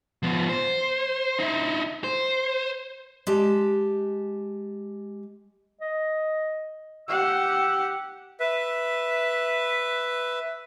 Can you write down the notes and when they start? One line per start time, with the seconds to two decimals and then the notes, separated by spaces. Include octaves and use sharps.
0.23 F3 B3
0.49 C5
1.39 D#4 E4
2.04 C5
3.27 G#3 G4 A5
5.81 D#5
7.08 G4 F#5 E6
8.40 B4 E5